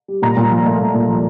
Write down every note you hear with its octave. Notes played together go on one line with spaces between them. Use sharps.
G3
A#2 A#5
A#2
F3
A3
A#2
A#2
F3